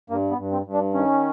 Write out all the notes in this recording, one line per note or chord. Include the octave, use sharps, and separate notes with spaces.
G2 A#3
B3
G2
C4
G2
D4
D#3 C#4